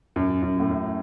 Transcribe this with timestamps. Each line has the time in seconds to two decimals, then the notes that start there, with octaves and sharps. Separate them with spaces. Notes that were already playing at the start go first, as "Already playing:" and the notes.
0.16 F#2
0.42 F#2
0.60 A2
0.70 F#2